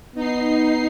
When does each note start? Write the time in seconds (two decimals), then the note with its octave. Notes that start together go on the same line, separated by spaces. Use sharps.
0.15 B3 D#4 C7